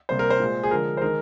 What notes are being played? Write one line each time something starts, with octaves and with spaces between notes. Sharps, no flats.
C3 G3 A#3 C5
A#4
C5
A#2 G#3
G#4
D3 F3 G#3 A#4
C5
D#3 G#3 A#4